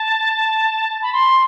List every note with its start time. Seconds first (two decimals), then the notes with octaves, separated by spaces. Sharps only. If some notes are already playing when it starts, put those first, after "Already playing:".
Already playing: A5
1.02 B5
1.13 C6